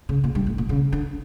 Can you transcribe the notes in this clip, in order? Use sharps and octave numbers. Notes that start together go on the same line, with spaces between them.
C#3
A#2
G2
A2
A#2
C#3
D3